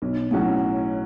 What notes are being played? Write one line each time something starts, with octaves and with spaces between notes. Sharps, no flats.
B1
A2 F#3 C#4 F#4